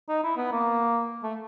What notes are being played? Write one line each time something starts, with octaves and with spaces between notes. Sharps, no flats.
D#4
E4
B3
A#3
A3